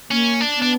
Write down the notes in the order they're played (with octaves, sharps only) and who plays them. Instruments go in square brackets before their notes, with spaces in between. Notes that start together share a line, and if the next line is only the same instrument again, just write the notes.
[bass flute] A#3 [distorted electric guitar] C#4
[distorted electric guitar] D4
[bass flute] B3
[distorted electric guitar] D4